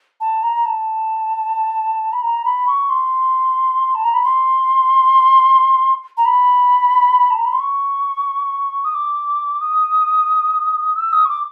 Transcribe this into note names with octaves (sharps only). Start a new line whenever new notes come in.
A5
A#5
A5
B5
A#5
B5
C#6
C6
A5
A#5
B5
C6
A#5
B5
A5
A#5
B5
C6
C#6
D#6
D6
D#6
E6
D#6
C#6
D6